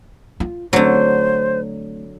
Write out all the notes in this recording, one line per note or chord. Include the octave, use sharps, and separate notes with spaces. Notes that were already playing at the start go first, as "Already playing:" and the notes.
F4
D3 F#3 A3 C4 C5